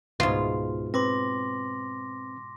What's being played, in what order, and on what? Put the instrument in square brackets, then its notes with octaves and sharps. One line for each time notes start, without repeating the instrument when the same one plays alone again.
[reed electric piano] C#2 [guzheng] G#2 B2 [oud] F4
[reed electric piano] C4 B4 [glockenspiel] C6 D6 A#6